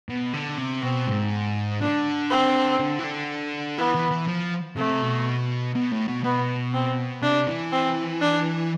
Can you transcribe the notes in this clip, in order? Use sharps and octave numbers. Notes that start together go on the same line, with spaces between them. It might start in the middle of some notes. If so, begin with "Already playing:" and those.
B2
D3
C3
B2 C4
G#2
D3 D4
C4
D3
E3
D3
E3 B3
E3
E3
F3
C3 A3
B2
B2
A2
B2
B2 B3
C4
C3 D4
E3
C4
D4